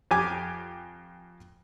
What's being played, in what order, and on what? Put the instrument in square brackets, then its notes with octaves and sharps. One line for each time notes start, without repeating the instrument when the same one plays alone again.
[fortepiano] F2 G4 G#5 D6